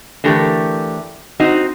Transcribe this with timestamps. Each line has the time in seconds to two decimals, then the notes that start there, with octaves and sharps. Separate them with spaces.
0.24 D3 E3 A3 G4 A#4
1.40 C4 D#4 F#4